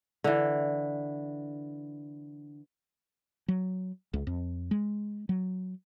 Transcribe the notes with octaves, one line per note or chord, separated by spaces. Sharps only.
D3 E3
F#3
C#2
F2
G#3
F#3